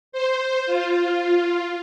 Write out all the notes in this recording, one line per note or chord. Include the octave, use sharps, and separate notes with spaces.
C5
F4